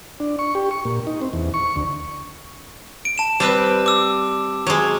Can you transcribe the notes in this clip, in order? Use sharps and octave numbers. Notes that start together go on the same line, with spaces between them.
D4
C#6
G4
C#6
A#2
D#4
C4
E2
C#6
D2
D7
A5 E7
G3 C4 B4
D6 E6
F#3 G#3